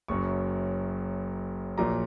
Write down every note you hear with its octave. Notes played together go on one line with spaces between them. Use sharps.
F#1 F#2 F#3 C#6
A#1 A#2 F#3 A#5